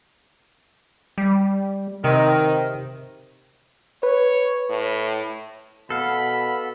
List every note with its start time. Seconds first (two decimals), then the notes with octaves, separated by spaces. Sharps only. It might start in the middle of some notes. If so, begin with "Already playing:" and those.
1.18 G3
2.04 C3 D#3
4.03 B4 C#5
4.70 A2
5.90 B2 A4 F5 F#5 B5